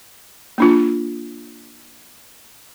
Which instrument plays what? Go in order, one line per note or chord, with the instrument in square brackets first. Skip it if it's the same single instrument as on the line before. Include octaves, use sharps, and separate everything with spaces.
[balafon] A#3 D4 F4